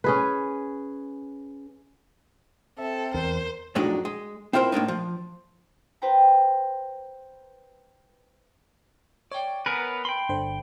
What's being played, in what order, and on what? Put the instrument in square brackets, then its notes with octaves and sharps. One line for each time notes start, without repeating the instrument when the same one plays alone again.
[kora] C#4 G#4 B4
[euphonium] C4 [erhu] A4 [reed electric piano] E5
[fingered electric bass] E2 [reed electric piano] A#4 [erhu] C5
[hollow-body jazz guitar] F2 A2 F#3 G#3 D4 D#4
G#3
C4 E4 F4 A#4 C5
A2 A#3 D4 D#4
F3
[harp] B4 C5 G5 A#5
[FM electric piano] C#5 [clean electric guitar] D5 G5
[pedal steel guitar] B3 A#4 B4 [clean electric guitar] G#5
[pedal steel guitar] G5 C6 [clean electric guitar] B5
[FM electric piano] G1 D3 C5